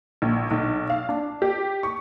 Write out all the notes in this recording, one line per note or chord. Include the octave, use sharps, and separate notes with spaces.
A#1
B1
F5
D4
G4
C#6